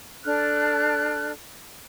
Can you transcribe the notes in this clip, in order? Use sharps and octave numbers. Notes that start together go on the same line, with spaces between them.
D4 A4 F6 F#6